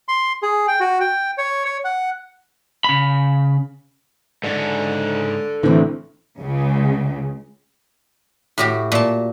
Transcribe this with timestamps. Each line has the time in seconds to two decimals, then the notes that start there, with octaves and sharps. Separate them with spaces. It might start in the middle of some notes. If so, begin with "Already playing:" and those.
0.08 C6
0.43 G#4
0.68 G5
0.80 F#4
1.00 G5
1.38 C#5
1.65 C#5
1.85 F#5
2.84 C#3 B5
4.44 G#2 C#4 A4 D5
5.63 A1 D3 E3 C4
6.40 C#2 C#3
8.58 A2 F#4 G4
8.92 A#2 A5